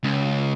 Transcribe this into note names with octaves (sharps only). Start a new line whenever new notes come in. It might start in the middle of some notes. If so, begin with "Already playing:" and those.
C#2